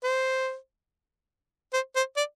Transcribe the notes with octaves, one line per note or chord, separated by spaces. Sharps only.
C5
C5
C5
D5